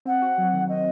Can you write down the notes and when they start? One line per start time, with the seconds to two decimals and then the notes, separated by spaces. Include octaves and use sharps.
0.05 C4 F#5
0.22 F#4
0.38 F#3
0.53 D#3
0.69 C4 D#5